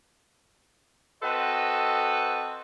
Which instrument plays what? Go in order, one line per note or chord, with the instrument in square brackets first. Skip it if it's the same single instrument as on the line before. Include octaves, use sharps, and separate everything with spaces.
[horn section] C4 F#4 A4 B4 D#5